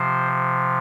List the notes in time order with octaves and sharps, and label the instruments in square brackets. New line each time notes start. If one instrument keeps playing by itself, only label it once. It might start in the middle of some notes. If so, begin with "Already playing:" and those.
Already playing: [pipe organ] C3 F3 C5